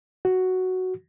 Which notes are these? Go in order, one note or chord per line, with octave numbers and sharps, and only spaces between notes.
F#4